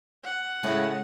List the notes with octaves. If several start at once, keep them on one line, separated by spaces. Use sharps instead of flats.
F#5
A2 C#3 G#3